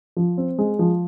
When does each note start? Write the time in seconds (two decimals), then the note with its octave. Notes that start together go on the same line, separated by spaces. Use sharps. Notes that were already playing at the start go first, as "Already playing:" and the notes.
0.17 F3
0.38 C4
0.58 G#3
0.79 F3